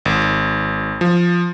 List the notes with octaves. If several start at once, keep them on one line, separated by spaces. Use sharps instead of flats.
G#1
F3